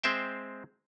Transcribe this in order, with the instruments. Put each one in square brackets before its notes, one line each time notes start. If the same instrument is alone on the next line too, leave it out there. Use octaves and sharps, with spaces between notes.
[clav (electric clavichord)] G#3 C4 C5 E5 G5